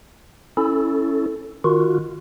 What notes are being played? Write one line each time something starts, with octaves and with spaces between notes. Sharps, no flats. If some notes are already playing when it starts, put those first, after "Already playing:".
C#4 E4 A4
D#3 F4 F#4